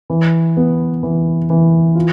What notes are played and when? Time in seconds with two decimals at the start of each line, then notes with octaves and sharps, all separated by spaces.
0.10 E3
0.57 B3
1.03 E3
1.50 E3
1.95 F4